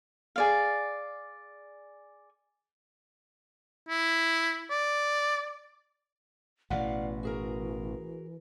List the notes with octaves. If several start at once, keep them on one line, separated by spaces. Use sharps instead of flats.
G#4 D5 F5
E4
D5
A1 B2 E3 D5 F5 F#5
F#4 G#4 A#4